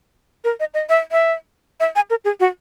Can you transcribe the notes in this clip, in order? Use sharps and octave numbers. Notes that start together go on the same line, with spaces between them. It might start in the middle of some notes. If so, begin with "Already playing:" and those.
A#4
D#5
D#5
E5
E5
E5
G#5
A#4
G#4
F#4